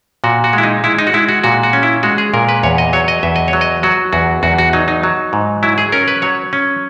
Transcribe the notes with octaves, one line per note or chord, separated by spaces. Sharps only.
A#2 F#4
F#4
G#3 E4
D#4
G#3 E4
D#4
F#4
G#3 E4
F#4
A#2 F#4
F#4
C#4
E4
G#3 F#4
G#4
A#2 A#4
B4
E2 C#5
D#5
F#3 C#5
D#5
E2 E5
D#5
C#5
F#3
D#5
F#3 F#4
E2 F#4
E2 F#4
F#4
F#3 D#4
D#4
F#3
G#2
F#3 E4
G#4
C#4 A#4
B4
F#3 C#5
C#4